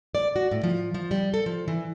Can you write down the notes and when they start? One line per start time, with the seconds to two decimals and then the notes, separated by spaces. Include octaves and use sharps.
0.15 D5
0.36 F#4
0.51 A2
0.63 F3
0.94 F3
1.11 G3
1.34 A4
1.46 F3
1.68 E3